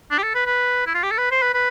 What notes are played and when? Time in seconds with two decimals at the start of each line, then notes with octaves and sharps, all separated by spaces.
0.11 D4
0.18 G4
0.23 A4
0.35 B4
0.46 B4
0.87 E4
0.94 F4
1.03 G4
1.11 A4
1.18 B4
1.31 C5
1.42 B4
1.54 B4